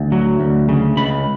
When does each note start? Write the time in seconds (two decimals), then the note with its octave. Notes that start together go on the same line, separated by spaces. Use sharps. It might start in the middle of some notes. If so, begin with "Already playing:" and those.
Already playing: D2
0.12 F#3
0.40 D2
0.69 C#3
0.97 C#2 B5